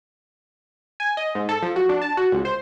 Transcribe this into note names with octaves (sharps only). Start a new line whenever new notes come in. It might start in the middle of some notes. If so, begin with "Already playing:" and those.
G#5
D#5
G#2
A4
F3
F#4
D4
A5
F#4
C#2
C5